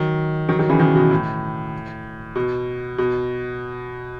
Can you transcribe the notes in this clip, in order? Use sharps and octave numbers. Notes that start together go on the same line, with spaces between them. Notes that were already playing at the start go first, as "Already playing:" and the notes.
Already playing: D#3 F#3
D#3 F#3
D#3 F#3
C#3 E3
B2 D#3
B2
A2
B2
B2